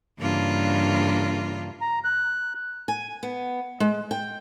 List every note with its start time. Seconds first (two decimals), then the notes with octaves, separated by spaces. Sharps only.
0.20 G2 C#3 E3 A#3 D4 F4
1.81 A#5
2.04 F#6
2.88 G#5
3.23 B3
3.80 G#3
4.11 G5